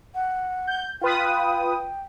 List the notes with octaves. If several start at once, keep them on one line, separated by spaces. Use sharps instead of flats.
F#5
G6
F4 B4 G5 D#6